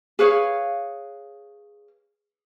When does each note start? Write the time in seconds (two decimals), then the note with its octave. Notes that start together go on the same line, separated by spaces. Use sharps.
0.19 G#4 B4 C#5 F5